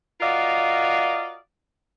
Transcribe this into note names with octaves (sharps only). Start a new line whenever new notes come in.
F4 F#4 A#4 D5 D#5 F5